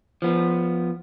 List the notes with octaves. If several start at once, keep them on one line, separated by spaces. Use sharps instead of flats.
F3 B3